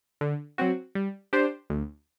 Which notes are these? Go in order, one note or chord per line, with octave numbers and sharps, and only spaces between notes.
D3
F#3 C4 F#4
G3
D4 G4 C5
D2